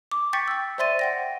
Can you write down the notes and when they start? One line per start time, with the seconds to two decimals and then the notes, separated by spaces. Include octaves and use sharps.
0.12 D6
0.33 G5 C#6 G6 A6 B6 C#7
0.48 C#6 E6
0.78 C5 D5 E5 C6 A6 D#7
0.99 F#5 G5 A#6